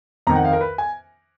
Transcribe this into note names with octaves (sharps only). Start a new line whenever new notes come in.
F2 D#3 A#5
F#5
F5
A#4
B4
G#5